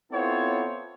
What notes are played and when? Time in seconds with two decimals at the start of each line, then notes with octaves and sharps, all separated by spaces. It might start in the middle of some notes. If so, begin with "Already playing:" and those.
0.12 B3 C4 E4 F4 A4 C#5